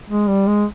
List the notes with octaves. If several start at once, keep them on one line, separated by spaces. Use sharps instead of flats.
G#3
G3
G#3